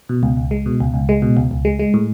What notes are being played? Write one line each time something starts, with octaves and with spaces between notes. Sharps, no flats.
B2
C#2
C#2
G#3
B2
C#2
C#2
G#3
B2
C#2
C#2
G#3
G#3
A2